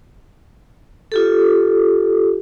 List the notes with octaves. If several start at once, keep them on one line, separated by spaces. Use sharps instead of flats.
F4 G4 A4